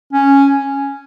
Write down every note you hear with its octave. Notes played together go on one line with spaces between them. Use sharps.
C#4